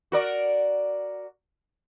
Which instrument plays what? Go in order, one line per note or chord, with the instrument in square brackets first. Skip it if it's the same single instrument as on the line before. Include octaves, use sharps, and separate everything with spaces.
[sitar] F#4 A#4 D5